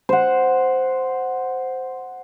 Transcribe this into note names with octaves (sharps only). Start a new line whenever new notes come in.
C5 F#5